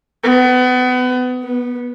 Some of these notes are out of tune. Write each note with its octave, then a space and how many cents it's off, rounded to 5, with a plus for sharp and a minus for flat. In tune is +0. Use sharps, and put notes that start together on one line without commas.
B3 +30
B3 -15